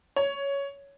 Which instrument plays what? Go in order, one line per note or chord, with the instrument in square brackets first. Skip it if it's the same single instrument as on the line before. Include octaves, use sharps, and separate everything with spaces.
[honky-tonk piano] C#5